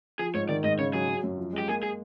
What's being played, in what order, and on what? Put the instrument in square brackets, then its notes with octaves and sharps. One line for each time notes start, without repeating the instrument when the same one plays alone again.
[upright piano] F3 [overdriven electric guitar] G#4
[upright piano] G#2 [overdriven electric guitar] C#5
[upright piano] D#3 [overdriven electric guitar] D5
[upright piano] G#2 [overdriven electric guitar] D#5
[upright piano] C#3 [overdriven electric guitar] C#5
[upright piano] F#3 [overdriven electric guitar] G#4
[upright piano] F#3
F#2
F3
G#3
[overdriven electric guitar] G4
[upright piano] A#3 [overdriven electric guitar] G#4
[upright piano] A#3 [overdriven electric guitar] G#4